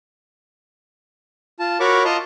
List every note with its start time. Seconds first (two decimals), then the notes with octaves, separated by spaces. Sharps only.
1.59 F4 A5
1.80 F#4 A#4 C#5 B5 C#6 D6
2.05 F4 D#5 A5 A#5 C6